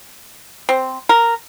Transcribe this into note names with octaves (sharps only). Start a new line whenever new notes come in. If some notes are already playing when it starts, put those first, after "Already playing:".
C4
A#4